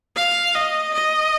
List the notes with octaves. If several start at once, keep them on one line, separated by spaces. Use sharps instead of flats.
F5
D#5
D#5